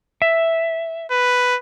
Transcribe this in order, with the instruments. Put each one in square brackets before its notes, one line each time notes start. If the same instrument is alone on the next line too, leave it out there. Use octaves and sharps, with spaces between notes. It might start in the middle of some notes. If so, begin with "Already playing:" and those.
[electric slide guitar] E5
[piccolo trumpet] B4